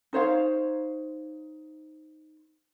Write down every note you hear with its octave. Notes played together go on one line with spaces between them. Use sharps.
D#4 C5 C#5 F5